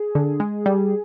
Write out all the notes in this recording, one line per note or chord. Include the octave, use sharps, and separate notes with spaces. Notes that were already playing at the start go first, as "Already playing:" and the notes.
Already playing: G#4
D3
G#3
G3